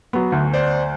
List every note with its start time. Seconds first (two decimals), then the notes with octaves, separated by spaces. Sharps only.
0.13 F#3 B3
0.32 D2
0.54 C5 D5